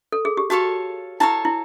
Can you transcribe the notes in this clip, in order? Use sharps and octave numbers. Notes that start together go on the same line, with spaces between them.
A4
G#4
G4
F#4 A4 C#5 F5 A5
E4 A4 C#5 F5 A5
E4